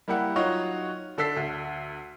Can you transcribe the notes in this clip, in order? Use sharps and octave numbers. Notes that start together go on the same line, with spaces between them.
G3 A#3 E4 G4 F#5
F#3 D#4 F4 F#4 C#5 D#5
D3 A4 E6 B6 C7
D2